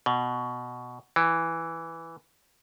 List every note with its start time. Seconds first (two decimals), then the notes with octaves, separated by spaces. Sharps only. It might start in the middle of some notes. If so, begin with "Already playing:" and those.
0.06 B2
1.16 E3